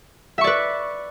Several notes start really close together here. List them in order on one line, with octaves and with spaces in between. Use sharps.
E5 C#6 D5 B4